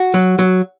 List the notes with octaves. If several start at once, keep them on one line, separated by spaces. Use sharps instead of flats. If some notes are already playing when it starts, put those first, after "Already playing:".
Already playing: F#4
F#3
F#3